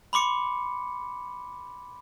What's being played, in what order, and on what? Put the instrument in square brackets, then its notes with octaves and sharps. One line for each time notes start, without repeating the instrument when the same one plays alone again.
[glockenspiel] B5 C6 D6 C#7